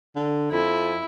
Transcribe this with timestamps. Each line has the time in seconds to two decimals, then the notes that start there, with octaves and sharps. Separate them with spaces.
0.16 D3
0.52 F2 E4